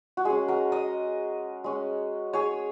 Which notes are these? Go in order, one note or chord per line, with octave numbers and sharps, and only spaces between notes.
F#4
G#3 C#4 G#4
F#4 A#4
A#4 D#5
G#3 C#4
G#4 C#5